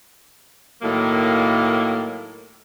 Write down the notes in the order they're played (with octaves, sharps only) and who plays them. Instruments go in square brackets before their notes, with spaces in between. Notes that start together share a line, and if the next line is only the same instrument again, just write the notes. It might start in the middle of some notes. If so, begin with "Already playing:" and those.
[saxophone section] A2 D#3 F#3 A#3